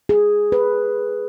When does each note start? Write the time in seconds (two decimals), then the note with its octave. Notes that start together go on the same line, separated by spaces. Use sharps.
0.09 G#4
0.52 B4